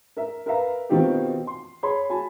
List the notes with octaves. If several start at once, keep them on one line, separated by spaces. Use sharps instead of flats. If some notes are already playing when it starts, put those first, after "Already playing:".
A#4 E5
A#4 B4 E5 F5 A#5
B2 D#3 C4 D#4 F4 G4
C6
G#4 C#5 B5 C6
F#4 G#5 A5 B5